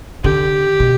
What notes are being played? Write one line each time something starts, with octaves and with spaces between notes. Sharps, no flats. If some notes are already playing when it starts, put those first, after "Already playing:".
D3 G4
B2